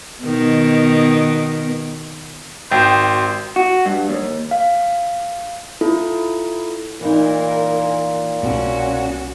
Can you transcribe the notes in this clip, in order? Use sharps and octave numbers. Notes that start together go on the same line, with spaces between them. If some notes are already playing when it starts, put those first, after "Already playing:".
B2 D#3
G#1 F#4 C5 G5
F#4
G2
D#2
F5
E4 F4 A4
A#2 E3 D#4 A#4
C2 B2 C#4 F#4